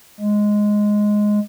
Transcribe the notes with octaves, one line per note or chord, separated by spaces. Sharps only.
G#3